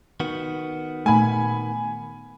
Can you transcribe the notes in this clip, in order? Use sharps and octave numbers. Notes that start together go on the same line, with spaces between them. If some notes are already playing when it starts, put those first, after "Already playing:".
D#3 B3 F#4
A#2 A3 G#5 B5